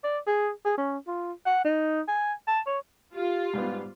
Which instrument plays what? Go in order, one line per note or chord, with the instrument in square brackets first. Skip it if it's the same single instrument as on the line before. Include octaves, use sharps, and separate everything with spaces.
[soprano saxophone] D5
G#4
G#4
C#4
F4
F#5
D#4
G#5
A5
C#5
[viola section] F4 [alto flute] G4
[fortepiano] G#2 G3 B3